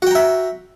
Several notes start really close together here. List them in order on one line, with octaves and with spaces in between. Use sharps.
F#4 G5 A#5 E5